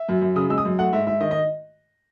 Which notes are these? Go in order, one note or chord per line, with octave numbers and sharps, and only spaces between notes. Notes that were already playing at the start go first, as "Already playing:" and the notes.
Already playing: E5
F#2
F#2
C#3 D#6
G#3 E6
D#6
F#2
A3 F#5
G#2 E5
G#2 E5
D#3 D#5
D#5